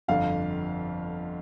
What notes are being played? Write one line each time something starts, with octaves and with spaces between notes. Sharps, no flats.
G1 F2 D3 F5